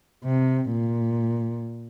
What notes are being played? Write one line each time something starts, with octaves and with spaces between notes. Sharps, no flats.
C3
A#2